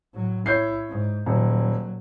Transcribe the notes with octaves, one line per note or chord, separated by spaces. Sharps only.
A2 F#3
E4 C#5 G6 C7
G#2
D#1 A#2 F#3